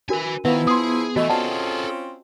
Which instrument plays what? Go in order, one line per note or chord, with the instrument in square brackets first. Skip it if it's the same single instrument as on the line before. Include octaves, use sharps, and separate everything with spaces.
[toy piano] D4 F#4 A#4 [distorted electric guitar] B4 G#5
[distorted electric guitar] D#3 [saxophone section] F3 E4 [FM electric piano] B3 [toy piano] E5 F5
[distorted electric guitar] G#4 [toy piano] C6 D#6
[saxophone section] B2 A3 [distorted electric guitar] E3 [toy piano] F#4 D#5
[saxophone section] C4 C#4 F4 [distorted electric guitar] G#4 A4 [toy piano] D5 F#5 A5